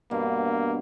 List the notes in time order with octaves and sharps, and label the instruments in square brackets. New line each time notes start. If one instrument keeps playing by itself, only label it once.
[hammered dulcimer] G2 B2 [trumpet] A#3